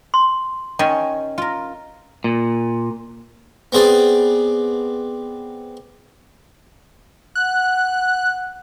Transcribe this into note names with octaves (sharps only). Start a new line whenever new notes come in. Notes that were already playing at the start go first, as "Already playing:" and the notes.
C6
D#3 C#4 G5 G#5
F4 A#4
A#2
B3 C4 G#4 D5
F#5 F#6